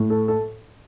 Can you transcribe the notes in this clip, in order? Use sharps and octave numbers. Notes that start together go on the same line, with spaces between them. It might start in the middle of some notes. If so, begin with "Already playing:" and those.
Already playing: A2
A4
A4